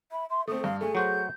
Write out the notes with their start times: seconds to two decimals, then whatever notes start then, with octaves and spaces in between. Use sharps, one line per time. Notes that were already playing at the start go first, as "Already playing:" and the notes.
0.11 E5 B5
0.30 E5 C6
0.48 A3 C4 A4 D#6
0.64 G2 F5
0.81 A3 G#4 G#5
0.95 F#3 F#4 C5 G6